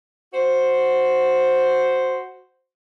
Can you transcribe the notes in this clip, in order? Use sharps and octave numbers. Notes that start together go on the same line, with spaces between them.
F#4 C5